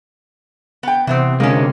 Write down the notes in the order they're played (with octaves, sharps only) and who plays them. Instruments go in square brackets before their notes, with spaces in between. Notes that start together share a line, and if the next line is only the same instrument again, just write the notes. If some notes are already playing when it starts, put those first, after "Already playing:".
[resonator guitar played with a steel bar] B3 G5
[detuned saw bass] C3 [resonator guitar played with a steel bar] E3 B3 C4
[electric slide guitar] D3 G#3 [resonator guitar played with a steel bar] A#3 C#4